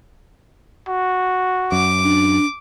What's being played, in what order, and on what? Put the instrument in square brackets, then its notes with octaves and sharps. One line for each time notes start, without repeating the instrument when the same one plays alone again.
[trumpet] F#4
[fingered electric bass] F#2 [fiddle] D6
[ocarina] D4